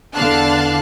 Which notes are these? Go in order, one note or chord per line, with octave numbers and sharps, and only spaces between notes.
E2 D3 D4 F5 A5 F#6